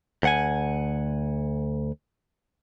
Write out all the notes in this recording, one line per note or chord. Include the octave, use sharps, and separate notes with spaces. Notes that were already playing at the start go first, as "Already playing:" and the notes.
D2 F#5 G#5